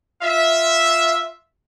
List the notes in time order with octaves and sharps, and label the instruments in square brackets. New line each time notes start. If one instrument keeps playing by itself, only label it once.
[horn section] F4 E5